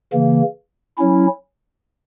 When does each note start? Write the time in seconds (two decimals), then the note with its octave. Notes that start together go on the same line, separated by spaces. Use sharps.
0.13 C#3 E3 A#3
0.98 F#3 C#4 E4